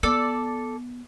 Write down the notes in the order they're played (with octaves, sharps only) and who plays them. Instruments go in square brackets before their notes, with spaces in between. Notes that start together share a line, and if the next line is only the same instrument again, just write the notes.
[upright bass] B3 [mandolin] A4 D5